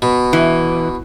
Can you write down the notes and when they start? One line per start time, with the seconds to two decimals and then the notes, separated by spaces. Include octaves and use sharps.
0.02 B2
0.33 E3